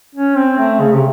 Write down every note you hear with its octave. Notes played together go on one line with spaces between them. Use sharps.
C#4
C4
A3
C#3
C3